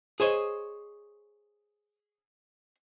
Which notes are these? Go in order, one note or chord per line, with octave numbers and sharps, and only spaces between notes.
G#4 C5 C#5 D#5